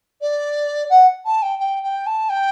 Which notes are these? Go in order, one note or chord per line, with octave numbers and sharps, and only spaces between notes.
D5
F#5
A5
G5
G5
G5
A5
G5